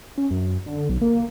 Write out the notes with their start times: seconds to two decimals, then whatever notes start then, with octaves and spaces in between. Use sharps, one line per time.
0.18 C#4
0.31 F#2
0.66 D3
0.89 B1
1.01 A#3